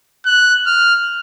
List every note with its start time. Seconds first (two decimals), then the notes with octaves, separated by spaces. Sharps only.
0.25 F#6
0.66 F6